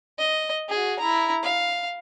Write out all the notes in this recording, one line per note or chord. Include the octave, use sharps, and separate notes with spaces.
D#5
F#4 G#4
E4 A#5
F5